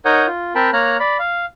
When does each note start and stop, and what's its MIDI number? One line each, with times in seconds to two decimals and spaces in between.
0.05 0.26 63
0.05 0.26 70
0.05 0.26 73
0.05 0.26 78
0.05 0.26 87
0.05 0.26 91
0.27 0.53 65
0.55 0.70 60
0.55 0.70 70
0.55 0.70 79
0.55 0.70 81
0.55 0.70 83
0.73 0.97 58
0.73 0.97 73
0.73 0.97 82
0.73 0.97 89
0.73 0.97 90
1.00 1.17 74
1.00 1.17 83
1.19 1.45 77